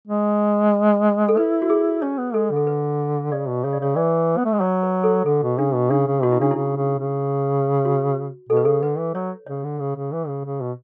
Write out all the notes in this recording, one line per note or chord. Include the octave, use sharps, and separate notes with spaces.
G#3
A4
E4 B4
F#4
G#4
C#4 C#5
B3
G#3 A4
D3
A4
B4
C#3 D5
B2
C#3 C#5
D5
C#3 C#5
E3 D5
B3
A3
G#3
F#3 C#5
B4
A4
D3 A4
B2
C#3 D4
B2
C#3 D4
C#3
B2 F#4
E4
C#3 D4
C#3 E4
C#3
C#3
F#4
B2 A4
B4
C#3 A4
D3 B4
E3
F#3 C#5
C#3 C#5
D3
C#3
C#3
E3
C#3
C#3
B2